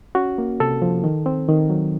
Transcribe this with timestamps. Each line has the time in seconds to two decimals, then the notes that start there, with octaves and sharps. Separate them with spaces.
0.15 C#4 F#4
0.38 A#3
0.60 C3 A4
0.82 F3
1.04 D#3
1.26 C4
1.49 D#3
1.70 F#3